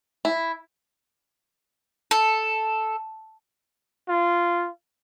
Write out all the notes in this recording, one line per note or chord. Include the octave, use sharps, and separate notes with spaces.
E4
A4
F4